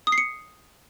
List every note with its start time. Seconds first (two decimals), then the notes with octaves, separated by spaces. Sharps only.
0.07 D#6
0.12 C7
0.18 C#7